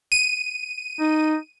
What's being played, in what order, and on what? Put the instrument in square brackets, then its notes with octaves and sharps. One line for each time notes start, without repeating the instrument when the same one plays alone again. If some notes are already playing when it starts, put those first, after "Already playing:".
[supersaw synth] D#7
[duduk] D#4